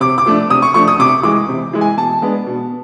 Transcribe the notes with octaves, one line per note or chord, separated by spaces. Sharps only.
C3 D6
D6
F3 A3 D4
C3 D#6
C#6
F3 A3 D4 C#6
D#6
C3 D6
E3 G#3 D6
C3
E3 G#3
G#5
B2 A5
G#3 B3 D4
B2